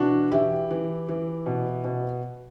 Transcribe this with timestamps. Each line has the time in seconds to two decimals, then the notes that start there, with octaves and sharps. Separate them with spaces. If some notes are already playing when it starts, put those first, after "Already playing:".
Already playing: B2 E3 D4 F#4
0.31 E3 E4 G4
0.70 E3
1.09 E3
1.46 B2
1.84 B2